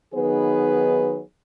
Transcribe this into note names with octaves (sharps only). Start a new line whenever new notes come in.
D#3 F#3 B3 D#4 G#4 B4